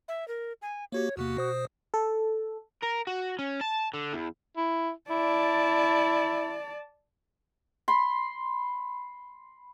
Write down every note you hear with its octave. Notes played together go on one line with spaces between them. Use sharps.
E5
A#4
G#5
A#3 F#4 G4 C#5
E2 C3 A#3 F#4
B2 C5 D#6
A4
A#4
F#4
C#4
A5
D3
E2
E4
E4 D5 A5
B5 C6